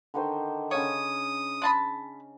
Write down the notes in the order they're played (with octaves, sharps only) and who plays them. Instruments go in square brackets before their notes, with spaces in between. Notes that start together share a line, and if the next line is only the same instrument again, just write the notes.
[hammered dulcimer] D3 D#3 C5
[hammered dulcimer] C#3 F5 [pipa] C#5 [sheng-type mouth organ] D#6
[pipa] G#3 A5 B5